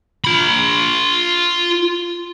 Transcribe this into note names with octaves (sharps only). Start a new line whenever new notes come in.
F4 B5